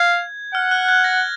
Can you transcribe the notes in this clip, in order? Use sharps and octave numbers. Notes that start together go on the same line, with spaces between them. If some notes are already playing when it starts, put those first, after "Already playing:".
Already playing: F5 G#6
F#5 F6
F#6
G#6
A#6